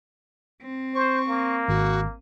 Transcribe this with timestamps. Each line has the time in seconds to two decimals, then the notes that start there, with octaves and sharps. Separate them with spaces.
0.62 C4
0.95 C5 C#6
1.28 A#3
1.68 G#1 F#4